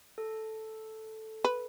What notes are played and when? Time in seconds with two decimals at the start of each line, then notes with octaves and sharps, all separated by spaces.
0.18 A4
1.44 B4